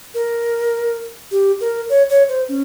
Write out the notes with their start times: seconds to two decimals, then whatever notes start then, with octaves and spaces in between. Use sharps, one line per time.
0.14 A#4
1.31 G4
1.61 A#4
1.89 C#5
2.10 C#5
2.29 C5
2.49 C#4